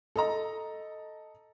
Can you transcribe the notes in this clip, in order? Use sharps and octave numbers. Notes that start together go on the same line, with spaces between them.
A4 D#5 A#5